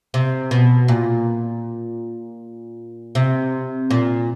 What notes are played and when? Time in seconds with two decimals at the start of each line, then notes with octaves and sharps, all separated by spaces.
0.14 C3
0.51 B2
0.88 A#2
3.15 C3
3.91 A#2